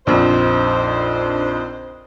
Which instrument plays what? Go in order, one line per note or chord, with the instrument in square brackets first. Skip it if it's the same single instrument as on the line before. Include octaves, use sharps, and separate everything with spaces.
[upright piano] A#1 F2 [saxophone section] D4 D#4 C5